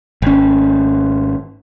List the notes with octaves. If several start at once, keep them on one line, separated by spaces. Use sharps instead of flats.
G#1 C#4